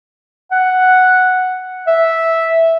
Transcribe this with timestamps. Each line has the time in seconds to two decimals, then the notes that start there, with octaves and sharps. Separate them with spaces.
0.51 F#5
1.88 E5